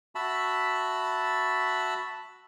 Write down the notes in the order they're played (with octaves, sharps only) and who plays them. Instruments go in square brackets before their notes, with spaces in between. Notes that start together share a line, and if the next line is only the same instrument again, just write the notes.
[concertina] F#4 E5 A5 B5